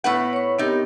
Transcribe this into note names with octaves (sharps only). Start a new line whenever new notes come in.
A2 B3 B4 F#5
C#5 C#6
C3 B3 D#4 G4 A#4